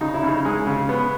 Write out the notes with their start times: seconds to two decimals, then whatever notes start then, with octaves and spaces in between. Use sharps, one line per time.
0.01 C#3 D#4
0.14 E4
0.23 C#3 D#4
0.45 G#3
0.67 C#3
0.89 B3